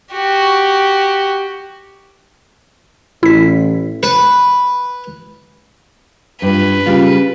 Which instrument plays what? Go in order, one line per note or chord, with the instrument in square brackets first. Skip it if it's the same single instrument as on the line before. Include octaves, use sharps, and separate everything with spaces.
[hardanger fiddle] F#4 G4
[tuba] A1 [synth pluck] E4 B6
[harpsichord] B4
[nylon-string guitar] G2 F4 [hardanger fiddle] B4
[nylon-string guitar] C#3 G3 F4